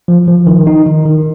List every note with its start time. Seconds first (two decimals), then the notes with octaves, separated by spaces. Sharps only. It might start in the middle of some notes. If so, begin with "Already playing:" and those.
0.08 F3
0.28 F3
0.47 D#3
0.67 D#4
0.86 D#3
1.05 D#3